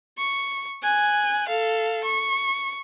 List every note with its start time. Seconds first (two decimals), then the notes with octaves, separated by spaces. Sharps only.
0.18 C#6
0.83 G#5 F#6
1.48 A4 F5
2.04 C#6